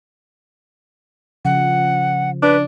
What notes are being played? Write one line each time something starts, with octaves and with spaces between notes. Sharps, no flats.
C#3 F3 F#5
D4 B4